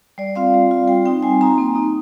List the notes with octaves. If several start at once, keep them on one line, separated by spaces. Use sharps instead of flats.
G3 D5
C4 F4 F5
G3
C4 F4
G3 G5
C4 D#4 G5
G3 G#5
C4 D#4 A#5
A#3
D#4